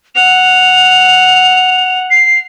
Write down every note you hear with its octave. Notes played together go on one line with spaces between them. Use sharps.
F#5 F7
C7